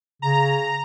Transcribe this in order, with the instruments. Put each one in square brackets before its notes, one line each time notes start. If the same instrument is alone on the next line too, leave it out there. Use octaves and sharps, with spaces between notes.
[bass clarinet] C#3 [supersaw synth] A#5